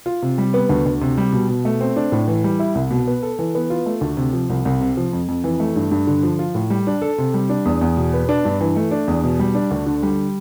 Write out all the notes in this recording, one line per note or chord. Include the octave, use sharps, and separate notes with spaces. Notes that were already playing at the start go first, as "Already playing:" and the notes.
F4
C3
G3
B3
D2
D2
C3
G3
B2
B2
A3
C4
D4
A2
E3
G3
E4
C2
B2
B3
A4
E3
B3
F4
A3
D2
C3
F3
C2
C2
C3
F3
F2
F2
E3
A3
G2
G2
D3
F3
F4
A2
G3
D4
A4
C3
G3
D4
E2
E2
B2
B3
D4
G2
E3
A3
D4
E2
B2
G3
D4
D2
D3
G3